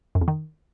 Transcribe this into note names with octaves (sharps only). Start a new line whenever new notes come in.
F#2
F2
D#3